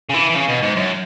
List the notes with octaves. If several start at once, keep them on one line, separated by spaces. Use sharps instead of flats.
C#3
E3
E3
C#3
B2
G#2
F#2